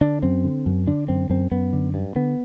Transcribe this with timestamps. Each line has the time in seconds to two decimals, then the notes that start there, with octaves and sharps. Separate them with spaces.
0.01 D3 D4
0.22 F#2 C4
0.44 D3
0.66 F#2
0.87 D3 D4
1.08 F#2 C4
1.30 F#2 C4
1.51 F#2 B3
1.73 D3
1.94 G2
2.15 D3 B3